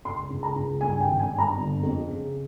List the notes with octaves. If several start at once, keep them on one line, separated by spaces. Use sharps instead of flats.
C#2 C6
C#2
A#5
C#2
G2 G#5
G5
G#1
G#5
G2
A#5
G1
F2
C#3